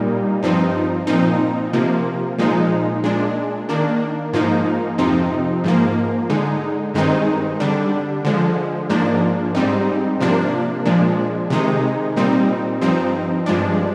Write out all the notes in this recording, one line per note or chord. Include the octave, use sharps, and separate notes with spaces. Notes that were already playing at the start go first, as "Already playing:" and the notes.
Already playing: A#2 G3 A#3 D#4
G2 F3 C4 D#4
A#2 F3 C4 D#4
C3 F3 A#3
A#2 F3 G#3 D#4
A#2 G#3 D4
D#3 A#3 D4
G#2 F3 A#3 D#4
F2 C3 F3 C4 D#4
G#2 F3 A#3
D3 G#3 D#4
G2 D#3 G#3 C4 D#4
D3 G3 D4
D3 F3 G#3
G#2 F3 A#3 D4
G#2 G3 C4 D#4
C3 F3 A#3 D4
A#2 F3 G#3 D4
C3 D#3 G#3 D#4
A#2 G3 C4 D#4
G2 F3 C4 D#4
G2 F3 G#3 D4